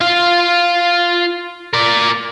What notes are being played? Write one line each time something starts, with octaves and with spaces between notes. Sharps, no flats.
F4 F5
A#4 D5